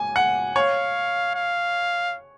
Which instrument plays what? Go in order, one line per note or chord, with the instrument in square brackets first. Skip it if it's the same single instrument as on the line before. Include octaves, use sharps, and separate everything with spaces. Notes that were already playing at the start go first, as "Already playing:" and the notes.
Already playing: [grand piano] G#5
F#5
[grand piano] C#5 [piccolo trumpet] F5
[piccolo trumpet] F5